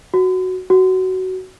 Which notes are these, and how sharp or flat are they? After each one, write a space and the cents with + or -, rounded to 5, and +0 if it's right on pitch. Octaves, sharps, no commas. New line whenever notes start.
F#4 +0
F#4 +15